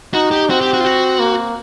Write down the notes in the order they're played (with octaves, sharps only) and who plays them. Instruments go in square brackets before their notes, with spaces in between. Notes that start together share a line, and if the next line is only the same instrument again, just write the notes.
[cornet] D#4 [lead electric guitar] F#4
[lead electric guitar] G4
[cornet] C4 [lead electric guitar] F#4
[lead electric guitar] G4
F#4
F4
F#4
[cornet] A#3